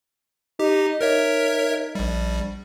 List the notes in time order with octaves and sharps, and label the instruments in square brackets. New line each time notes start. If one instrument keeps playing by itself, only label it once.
[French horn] D#4 [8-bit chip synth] G4
[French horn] D#4 [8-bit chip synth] A#4 C#5 E5
[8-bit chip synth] A#1 G3